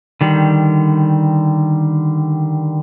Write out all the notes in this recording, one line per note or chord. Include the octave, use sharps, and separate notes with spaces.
D3 D#3 G3